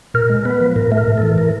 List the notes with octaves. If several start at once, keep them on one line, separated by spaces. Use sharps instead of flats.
A#2 A#4
G#3
B3 B4
F3
A2 A#4
A3
A#4
A2
E3 A4
A#4